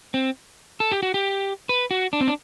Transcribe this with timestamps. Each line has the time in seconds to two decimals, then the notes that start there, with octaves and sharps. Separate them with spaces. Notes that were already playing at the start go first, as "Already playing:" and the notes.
0.14 C4
0.80 A4
0.92 G4
1.03 F#4
1.14 G4
1.69 B4
1.91 F#4
2.13 D4
2.21 C4
2.28 D4